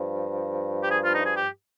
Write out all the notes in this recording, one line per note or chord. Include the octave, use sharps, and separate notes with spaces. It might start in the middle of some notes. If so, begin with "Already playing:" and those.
Already playing: G2 F3
G4
G#4
F4
D#4
G#4
G4